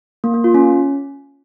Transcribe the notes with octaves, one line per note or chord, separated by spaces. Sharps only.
A#3
A#3
F4
C#4